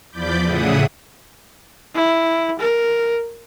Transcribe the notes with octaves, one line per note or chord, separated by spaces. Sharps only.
E2 F3 D5 B5 D6 G6
A2 C#3 G#4 E5 F#5 D#6
E4
A#4